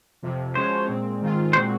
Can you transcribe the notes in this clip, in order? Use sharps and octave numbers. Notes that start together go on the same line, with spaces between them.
F2 C3 F3
F3 G#3 C#4 F#4 C5 C#5
A#2 G#3 C4
G#2 D#3 G#3 C4 F4
A#2 G#3 C4 F#4 C5